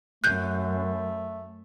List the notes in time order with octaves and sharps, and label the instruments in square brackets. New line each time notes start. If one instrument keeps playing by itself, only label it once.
[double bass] F#2 [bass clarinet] A3 [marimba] F#6 G6